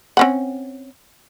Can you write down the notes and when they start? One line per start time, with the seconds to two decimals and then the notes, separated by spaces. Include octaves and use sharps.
0.17 C4 C#4 F#5